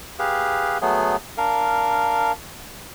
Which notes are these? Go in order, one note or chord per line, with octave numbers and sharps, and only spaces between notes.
G4 G#4 B4 F5
F#3 A3 B3 G#4
D4 A#4 F5